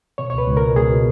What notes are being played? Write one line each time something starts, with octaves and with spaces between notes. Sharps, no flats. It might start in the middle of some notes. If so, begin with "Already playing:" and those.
B2 C#5
C#2 C#5
B4
C#2
A#4
B2
C#2 G#4
B2